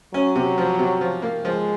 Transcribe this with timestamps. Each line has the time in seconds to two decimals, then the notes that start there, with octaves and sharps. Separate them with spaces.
0.14 F#3 C#4
0.36 C3
0.58 F3
0.79 C3
1.01 F3
1.22 A#3
1.45 F3 G#3